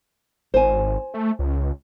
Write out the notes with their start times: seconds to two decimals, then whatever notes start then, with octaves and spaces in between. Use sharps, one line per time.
0.54 G#1 C5 G#5
1.14 A3
1.39 C#2